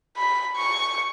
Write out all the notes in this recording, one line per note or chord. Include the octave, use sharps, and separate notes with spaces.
B5
C#6